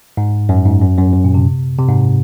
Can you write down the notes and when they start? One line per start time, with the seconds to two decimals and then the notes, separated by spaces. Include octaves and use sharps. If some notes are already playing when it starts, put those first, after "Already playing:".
0.17 G#2
0.49 F#2
0.65 G#2
0.82 F#2
0.98 F#2
1.13 F#2
1.24 A#2
1.34 C3
1.78 C3
1.88 G#2